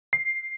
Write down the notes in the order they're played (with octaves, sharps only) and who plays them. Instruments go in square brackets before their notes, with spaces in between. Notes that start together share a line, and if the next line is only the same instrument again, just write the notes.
[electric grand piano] C7